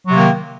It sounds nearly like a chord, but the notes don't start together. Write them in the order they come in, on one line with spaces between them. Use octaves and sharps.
F#3 C3 A#3 D#3